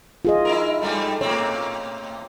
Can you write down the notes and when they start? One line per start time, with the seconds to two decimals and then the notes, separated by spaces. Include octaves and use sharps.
0.25 F4 G#4 D#5
0.45 D#4 E4 A#4
0.81 G2 G3 A3
1.21 A2 A#3 C4 C#5